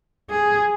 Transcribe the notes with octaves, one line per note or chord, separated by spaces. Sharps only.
G#4